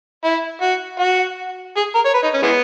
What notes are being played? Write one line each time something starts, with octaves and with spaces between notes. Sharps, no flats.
E4
F#4
F#4
G#4
A#4
C#5
B4
D#4
C#4
E3 G#3 B3